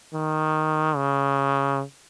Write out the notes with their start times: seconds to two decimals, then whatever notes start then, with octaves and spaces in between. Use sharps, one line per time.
0.13 D#3
0.96 C#3